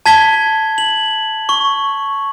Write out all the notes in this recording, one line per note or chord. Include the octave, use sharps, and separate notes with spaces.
A5 G#6 B6 G7
F#7
C#6